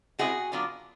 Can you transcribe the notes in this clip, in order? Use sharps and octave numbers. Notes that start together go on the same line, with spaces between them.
B2 G#3 C4 E4 F#4 G#4
D3 F#3 B3 D4 F4